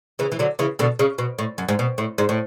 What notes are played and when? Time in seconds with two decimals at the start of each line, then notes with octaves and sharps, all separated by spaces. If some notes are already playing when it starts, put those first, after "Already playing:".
0.19 C#3 E3
0.32 E3
0.39 D3 F#3
0.59 C#3 E3
0.79 B2 D3
0.99 C#3
1.18 B2
1.38 A2
1.58 F#2
1.69 G#2
1.79 B2
1.98 A2
2.18 G#2
2.29 A2